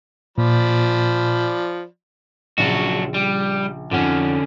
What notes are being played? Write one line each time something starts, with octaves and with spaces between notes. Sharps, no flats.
A#2 F3 D5 B5
A#1 C#3 F#3 D4 F#4
G3
F2 D3 C#4 D#4 F#5